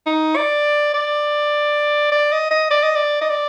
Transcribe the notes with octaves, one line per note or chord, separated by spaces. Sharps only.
D#4
D5
D5
D5
D#5
D#5
D5
D#5
D5
D#5
D5